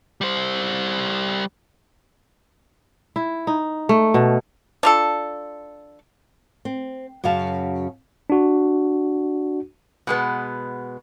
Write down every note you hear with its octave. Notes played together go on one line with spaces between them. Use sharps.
G3 C5
E4
D#4
A3
B2
D4 F4 A4
C4
F#2 C#3 F#4 F5 A5
D4 F#4
B2 G#3 B3